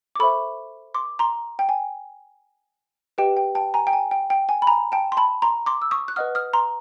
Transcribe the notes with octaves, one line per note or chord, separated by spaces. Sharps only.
D6
A4 C5 E5 B5 C#6
C6 D6
A#5 C6
G5
G#5
G4 B4 D#5 G5
G5
G5 A5
G#5 A#5
G5
G#5
G5
G5
G#5
B5
G#5 A#5
G5 A5
C6
A5 B5
A#5 C6
C6 D6
E6
C#6 D#6
F#6
B4 D#5 F#5 D#6 F6
D#6 F6
A#5 C6